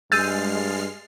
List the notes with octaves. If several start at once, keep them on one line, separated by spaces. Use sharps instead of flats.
G2 G#3 E6 F6 G6 A6 C7 D#7